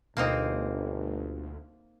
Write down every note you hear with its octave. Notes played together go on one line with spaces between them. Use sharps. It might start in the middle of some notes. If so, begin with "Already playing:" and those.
G1 D2 B2 A#3 C4 D#4